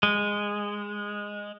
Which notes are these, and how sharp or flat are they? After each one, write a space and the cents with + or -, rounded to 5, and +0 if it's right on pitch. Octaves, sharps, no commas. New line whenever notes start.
G#3 -10